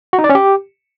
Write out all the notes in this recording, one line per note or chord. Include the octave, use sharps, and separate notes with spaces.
F#4
D#4
D5
C#4
G4